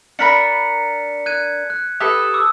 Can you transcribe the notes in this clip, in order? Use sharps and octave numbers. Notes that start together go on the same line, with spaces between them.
D4 A#4 B5 A#6 B6 C#7
F#6 G#6 D#7
F#6
G4 A4 B4 D#6
D6 E6